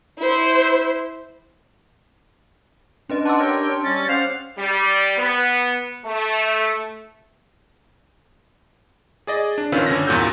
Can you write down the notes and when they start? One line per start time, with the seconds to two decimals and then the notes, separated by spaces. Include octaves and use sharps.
0.18 E4 C5
3.10 C#4 D4 B4 D#5
3.25 D#4 D5 F#5 A5 C6 E6
3.40 G4 A#4 C#5 G5
3.83 G3 C#4 A6
4.08 C#4 G4 C5 F5 F#5
4.58 G3
5.17 B3
6.05 A3
9.27 G#4 D5 D#5
9.58 D4
9.72 A#1 D#3 C#4 F4 B4 E6
9.86 G1 D3 C#4 A#6
10.07 E2 G2 A#2 F#4 E6 G6